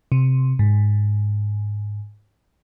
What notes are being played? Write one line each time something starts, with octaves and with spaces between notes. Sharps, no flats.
C3
G#2